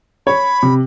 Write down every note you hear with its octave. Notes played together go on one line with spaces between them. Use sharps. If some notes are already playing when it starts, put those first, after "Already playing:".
C#5 B5
C3